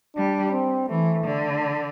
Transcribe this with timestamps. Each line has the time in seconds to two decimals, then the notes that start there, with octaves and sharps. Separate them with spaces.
0.16 G3 D4
0.52 C4
0.89 E3 A3
1.25 D3